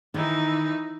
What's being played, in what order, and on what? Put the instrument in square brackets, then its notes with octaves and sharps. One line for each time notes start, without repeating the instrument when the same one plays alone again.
[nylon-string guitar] D#3 [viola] E3 D#4